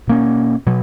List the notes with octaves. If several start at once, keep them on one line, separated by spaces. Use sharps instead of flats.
B2 A#3 C#4
B2 F#3